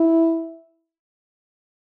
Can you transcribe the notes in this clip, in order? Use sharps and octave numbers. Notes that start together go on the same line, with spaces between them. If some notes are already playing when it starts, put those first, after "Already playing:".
Already playing: E4